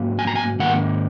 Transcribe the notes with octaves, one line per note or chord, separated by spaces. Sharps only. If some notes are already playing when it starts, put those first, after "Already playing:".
Already playing: G#2 F#3 A#3 C#4
G#5
A#5
G#5
G#2 D#3 A#3 F#5